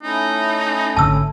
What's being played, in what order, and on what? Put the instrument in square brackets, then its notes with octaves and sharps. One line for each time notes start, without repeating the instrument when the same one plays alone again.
[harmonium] A3 C#4 E4 [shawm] D#4
[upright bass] G#1 D3 [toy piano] A5 E6